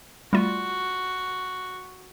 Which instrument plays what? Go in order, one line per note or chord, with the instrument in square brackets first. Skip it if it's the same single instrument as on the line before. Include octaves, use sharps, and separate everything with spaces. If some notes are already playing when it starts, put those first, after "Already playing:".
[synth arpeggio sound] G3 A3 F4 [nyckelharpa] F#4